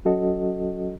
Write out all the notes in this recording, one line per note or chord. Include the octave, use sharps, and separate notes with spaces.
F#3 C#4 F#4 A4 D#5